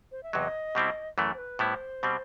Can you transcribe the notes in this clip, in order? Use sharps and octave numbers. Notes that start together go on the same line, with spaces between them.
C5
E5
E2 C3 F#3 D#5
B2 G3 C4 E4
F#2 E3 A3
C5
B4
A2 G3 B3 E4 C5
B2 G3 C4